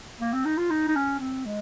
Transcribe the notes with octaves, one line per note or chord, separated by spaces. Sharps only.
A#3
C4
D#4
F4
D#4
D#4
C#4
C4
G#3